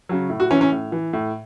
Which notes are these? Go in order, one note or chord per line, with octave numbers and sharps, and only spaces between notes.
C#3 F#3
A2
F#4
E3 C#4
C#4
A2
E3
A2